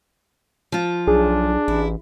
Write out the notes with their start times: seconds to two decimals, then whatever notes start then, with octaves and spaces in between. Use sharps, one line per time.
0.72 F3 F4
1.07 B1 D4 G#4
1.68 A1 E4